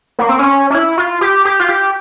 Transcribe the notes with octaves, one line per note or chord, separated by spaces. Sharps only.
A#3
C4
C#4
C#4
E4
F4
G4
G4
F4
G4